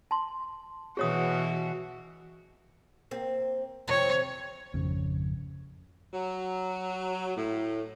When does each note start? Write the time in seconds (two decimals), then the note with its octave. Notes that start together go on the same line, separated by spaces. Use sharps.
0.11 A5 C6
0.97 B2 E3 F#4 G#4 C#5 D#6
3.11 A#3 C4
3.88 C3 F3 C#5
4.73 G#1 F2 C#3
6.13 F#3
7.37 A2